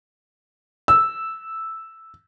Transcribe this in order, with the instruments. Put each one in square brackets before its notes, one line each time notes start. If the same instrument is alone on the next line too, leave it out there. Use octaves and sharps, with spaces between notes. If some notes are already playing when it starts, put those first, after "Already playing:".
[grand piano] E6